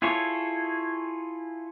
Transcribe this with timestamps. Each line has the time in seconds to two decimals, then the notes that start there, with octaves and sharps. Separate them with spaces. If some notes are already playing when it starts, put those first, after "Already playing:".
0.02 E4 F4 G#4 A4 C#5